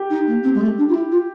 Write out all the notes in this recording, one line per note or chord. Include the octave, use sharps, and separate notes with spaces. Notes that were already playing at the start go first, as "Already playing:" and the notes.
Already playing: G4
D#4
A#3
C4
G#3
A3
D4
F4
E4
F4